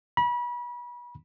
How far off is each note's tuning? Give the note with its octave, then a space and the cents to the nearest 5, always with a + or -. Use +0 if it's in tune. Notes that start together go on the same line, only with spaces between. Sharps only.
B5 -30